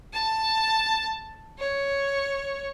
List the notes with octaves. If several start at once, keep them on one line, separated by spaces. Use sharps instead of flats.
A5
C#5